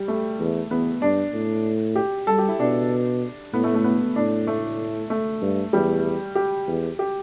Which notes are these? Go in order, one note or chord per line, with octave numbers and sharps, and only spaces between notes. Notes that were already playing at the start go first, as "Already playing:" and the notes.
Already playing: G3
A3
E2
E2 B3
G2 D4
A2
G4
G3 A4
G4
E4
B2 D4
A2 B3
A3
A3
B3
A2 D4
A3
A3
G2
E2 G3
G4
E2
G4